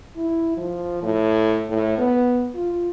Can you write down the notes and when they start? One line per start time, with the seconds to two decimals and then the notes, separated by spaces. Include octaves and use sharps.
0.16 E4
0.57 F3
1.02 A2
1.69 A2
1.98 B3
2.55 F4